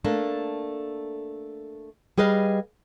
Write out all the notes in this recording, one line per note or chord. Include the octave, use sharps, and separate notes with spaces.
A3 A#3 D4
G3 G#4 B4 D#5 F5